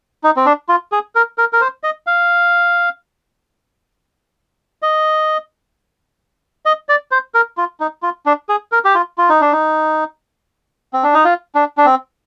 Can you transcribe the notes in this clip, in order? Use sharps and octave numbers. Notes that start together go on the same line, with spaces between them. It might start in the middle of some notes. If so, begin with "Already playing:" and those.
D#4
C4
D4
F4
G#4
A#4
A#4
A#4
C5
D#5
F5
D#5
D#5
D5
C5
A#4
F4
D#4
F4
D4
G#4
A#4
G4
F4
F4
D#4
D4
D#4
C4
D4
D#4
F4
D4
D4
C4